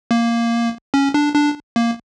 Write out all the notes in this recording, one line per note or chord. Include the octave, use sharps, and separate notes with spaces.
A#3
C#4
D4
D4
A#3